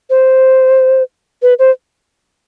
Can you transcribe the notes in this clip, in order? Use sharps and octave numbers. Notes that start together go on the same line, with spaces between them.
C5
B4
C5